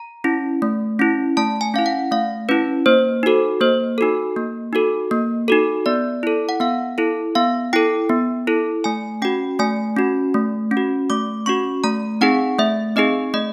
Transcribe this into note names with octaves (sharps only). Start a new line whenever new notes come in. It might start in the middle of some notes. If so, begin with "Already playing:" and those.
Already playing: A#5
C#4 E4
A3
C#4 E4
A3 A5
G#5
C#4 E4 F5
F#5
A3 F5
C#4 E4 B4
A#3 C5
D#4 F#4 A4
A#3 C5
D#4 F#4 A4
A#3
D#4 F#4 A4
A#3
D#4 F#4 A4
B3 D5
E4 A4
F#5
B3 F5
E4 A4
B3 F5
E4 A4 G5
B3
E4 A4
A3 G#5
C#4 F#4 G5
A3 G#5
C#4 F#4
A3
C#4
F#4
A3 D6
C#4 F#4 C#6
A3 A#5
C4 D#4 G#4 F#5
A3 E5
C4 D#4 G#4 D#5
A3 D#5